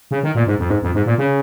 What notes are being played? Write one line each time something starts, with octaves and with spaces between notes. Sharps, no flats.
C#3
D#3
A#2
G#2
F2
G#2
F2
G#2
A#2
C#3